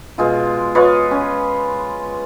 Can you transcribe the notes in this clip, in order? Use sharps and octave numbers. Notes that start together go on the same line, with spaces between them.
B2 G#3 F4
F4 B4 C#5 D#5
C#4